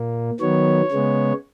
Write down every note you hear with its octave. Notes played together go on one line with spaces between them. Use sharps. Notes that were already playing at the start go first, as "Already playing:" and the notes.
Already playing: A#2 A#3
D#3 F#3 B3 C#5
C#3 G#3 B3